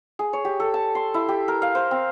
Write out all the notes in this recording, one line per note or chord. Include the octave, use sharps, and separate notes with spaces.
G#4
C#5
G4
A4
A5
C6
E4
G4
A#4
F5
C5
C4